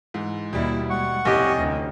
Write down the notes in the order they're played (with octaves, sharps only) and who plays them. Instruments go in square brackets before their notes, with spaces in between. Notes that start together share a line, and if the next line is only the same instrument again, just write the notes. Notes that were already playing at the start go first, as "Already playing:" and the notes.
[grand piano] G#2 E3
[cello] D#2 E4 [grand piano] B2 G3
[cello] G#3 [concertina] F#5 C#6
[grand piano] F1 C2 [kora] C#4 G4 D5 [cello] D#5
[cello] D2